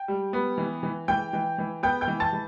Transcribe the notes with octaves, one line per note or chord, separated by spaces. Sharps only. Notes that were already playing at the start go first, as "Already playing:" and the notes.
Already playing: G5
G3
B3
E3
E3
E3 G5 G6
E3
E3
B3 G5 G6
G5 G6
E3
A5 A6
E3